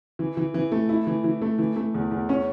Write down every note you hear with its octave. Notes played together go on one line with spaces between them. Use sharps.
E3
E3
E3
A3
E4
E3
E3
A3
E3
A3
E2
E2
C#4